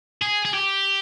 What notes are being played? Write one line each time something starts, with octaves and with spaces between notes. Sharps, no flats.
G#4
G#4
G4